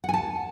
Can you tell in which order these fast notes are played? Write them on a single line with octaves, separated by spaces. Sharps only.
F#5 G#5 A5